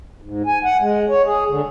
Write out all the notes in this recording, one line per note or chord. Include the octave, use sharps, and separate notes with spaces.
G#2
G#5
F#5
G#3
C#5
G#4
D3